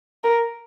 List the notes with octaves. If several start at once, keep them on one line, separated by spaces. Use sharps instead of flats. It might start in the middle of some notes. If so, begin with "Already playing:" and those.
A#4